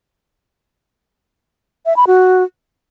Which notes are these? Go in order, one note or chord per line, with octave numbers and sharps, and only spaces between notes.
E5
B5
F#4